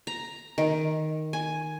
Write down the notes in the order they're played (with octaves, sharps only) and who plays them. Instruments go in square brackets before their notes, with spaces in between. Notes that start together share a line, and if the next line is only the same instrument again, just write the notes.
[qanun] A#5
D#3
G#5